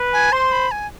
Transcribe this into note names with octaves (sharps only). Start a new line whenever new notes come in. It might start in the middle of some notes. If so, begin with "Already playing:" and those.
Already playing: B4
G#5
C5 C6
B5
G#5